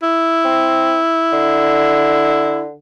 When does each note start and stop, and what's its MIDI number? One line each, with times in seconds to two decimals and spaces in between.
0.03 2.64 64
0.45 0.99 60
1.32 2.74 50